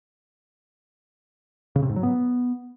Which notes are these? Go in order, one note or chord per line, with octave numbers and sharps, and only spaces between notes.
C#3
C3
G#2
F#3
B3